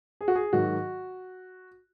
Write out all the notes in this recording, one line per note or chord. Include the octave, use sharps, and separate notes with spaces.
G#4
F#4
G#4
G#2 D#3 F#3 F#4